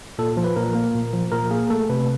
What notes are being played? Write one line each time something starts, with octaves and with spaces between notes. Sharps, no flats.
A#2 A4
F3
B4
A#2 A#4
A#3
A#2
F3
A#2 A#4
A#3 G#4
A3 A4
C3 B4